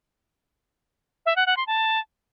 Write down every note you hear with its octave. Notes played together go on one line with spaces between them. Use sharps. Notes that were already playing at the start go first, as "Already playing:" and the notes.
E5
F#5
F#5
C6
A5